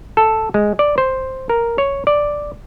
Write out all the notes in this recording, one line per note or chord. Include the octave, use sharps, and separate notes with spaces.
A4
G#3
D5
C5
A#4
C#5
D5